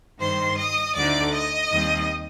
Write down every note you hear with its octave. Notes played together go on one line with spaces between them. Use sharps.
G2 D#3 G3 C5 C6
D#5 D#6
D2 D3 A3 D#4 D5 D6
D#5 D#6
D#2 D#3 G3 C4